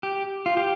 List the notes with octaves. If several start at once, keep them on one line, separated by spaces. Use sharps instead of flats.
G4
F4
G4